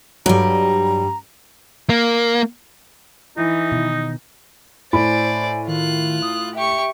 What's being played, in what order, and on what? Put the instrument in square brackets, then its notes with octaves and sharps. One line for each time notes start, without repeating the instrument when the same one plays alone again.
[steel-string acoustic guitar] G2 G3 [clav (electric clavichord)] F#3 [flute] A#5
[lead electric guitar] A#3
[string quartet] E3 [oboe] D#4 [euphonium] E4
[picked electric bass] B2 D#3
[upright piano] A2 B5 [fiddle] C5 D5 [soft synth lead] G#5
[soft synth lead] D#3 [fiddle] F4 F#6
[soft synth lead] D#6
[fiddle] G4 C#6 [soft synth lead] E5